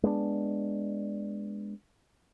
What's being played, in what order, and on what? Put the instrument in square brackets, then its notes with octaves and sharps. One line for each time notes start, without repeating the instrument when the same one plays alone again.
[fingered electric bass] G#3 B3 C4 D4